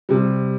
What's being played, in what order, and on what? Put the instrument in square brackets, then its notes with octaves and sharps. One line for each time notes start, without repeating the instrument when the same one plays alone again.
[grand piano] C3 G3